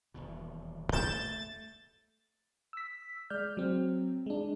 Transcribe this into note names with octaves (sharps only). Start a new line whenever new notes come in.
D#1 E2 B2
E2 G3 B3 G6 A6 E7
A3 A6
E6 B6
G#3 D5 F6 G6
F#3 C4
G#3 D4